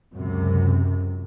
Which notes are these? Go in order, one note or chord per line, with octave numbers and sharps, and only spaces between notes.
C#2 F#2 C3